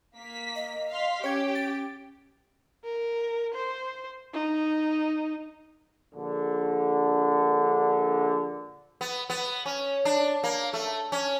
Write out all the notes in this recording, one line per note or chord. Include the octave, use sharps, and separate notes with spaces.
A#3 B6
D#5
F5 C6 B6
C#4 G4 C#5 G5 G#6
A6 D7
A#4
C5
D#4
A#1 D3
B3
B3
C#4
D4
A#3
A3
C#4